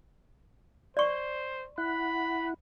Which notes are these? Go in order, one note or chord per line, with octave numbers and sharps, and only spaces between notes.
C5 D5 C#6
E4 F#5 B5